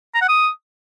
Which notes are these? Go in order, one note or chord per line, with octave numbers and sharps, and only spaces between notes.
A#5
F#5
D#6